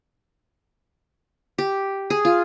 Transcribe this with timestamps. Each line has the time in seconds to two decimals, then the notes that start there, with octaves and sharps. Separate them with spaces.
1.58 G4
2.10 G#4
2.25 F4